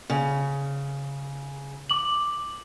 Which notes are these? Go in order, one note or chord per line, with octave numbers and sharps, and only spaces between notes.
C#3
D6 F#7